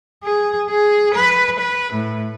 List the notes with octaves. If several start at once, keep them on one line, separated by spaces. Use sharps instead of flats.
G#4
G#4
B4
B4
A2